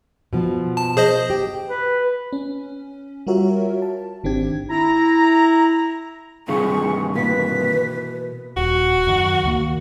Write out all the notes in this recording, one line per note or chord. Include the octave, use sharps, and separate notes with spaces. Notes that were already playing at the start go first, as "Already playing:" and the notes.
B2 F3
A5
G#4 C5 D#5
G4
B4
C#4
G3 F4 F#4 A#4 C#5 E5
A5
G#1 D#3 C4 D4 G4 G#6
E4 A#5
G2 C3 D#3 F4 G#4 C#6
B2 E3 A#3 B4 B6
D#1 F#4
F#2 D#3
D2 D#3 A#3